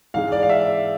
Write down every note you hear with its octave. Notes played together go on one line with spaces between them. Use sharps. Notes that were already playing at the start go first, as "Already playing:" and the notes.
G#2 E3 G#3 F5
D5
F5
E5